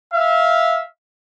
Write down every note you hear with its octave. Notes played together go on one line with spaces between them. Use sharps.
E5 F5